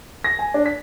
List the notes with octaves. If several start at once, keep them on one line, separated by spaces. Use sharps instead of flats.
A#6
G#5
D4
B6